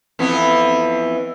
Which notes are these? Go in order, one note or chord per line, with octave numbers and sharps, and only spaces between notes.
F2 E3 B3